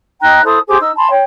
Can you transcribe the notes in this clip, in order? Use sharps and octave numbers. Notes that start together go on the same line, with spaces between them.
D#4 G5 A#5 F#6
E4 A4 C5 D#6
G4 G#4 C5 D6
D#4 E6
G#5 A5 B5 C6
C#5 G5